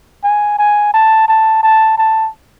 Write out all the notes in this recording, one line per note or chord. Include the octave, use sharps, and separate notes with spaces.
G#5
G#5
A5
A5
A5
A5